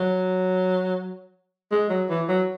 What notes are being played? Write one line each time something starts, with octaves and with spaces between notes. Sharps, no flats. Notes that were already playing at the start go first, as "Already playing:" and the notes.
Already playing: F#3
G#3
F#3
E3
F#3